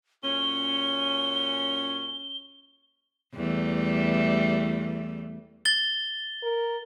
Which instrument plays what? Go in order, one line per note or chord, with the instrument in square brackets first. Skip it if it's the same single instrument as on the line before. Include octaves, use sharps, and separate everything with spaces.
[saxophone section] F#2 A#2 C#4 [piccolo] G7
[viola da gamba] E2 G3 A3
[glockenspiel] A6 G7
[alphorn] A#4